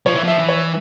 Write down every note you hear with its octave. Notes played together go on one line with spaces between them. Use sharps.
F3 C#5
E3
F3 E5
E3
C#5